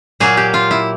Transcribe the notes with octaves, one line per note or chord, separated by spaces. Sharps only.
A#2 F#3 A#3 G#4
G4
F4
E4